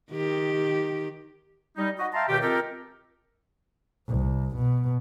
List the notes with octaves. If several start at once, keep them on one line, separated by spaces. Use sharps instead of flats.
D#3 G4
G3 D#4
F#4 D#5
E5 F5 G5 A5 A#5 C6
C#2 B2 D#3 G4
G#3 C4 F4 G4 A4 A#4
C2
B2